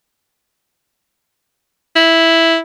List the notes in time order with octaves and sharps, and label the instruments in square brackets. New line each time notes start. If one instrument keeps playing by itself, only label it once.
[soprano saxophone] E4